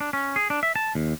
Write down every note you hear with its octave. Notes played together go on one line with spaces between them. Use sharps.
D4
C#4
G#4
D4
E5
A5
D#2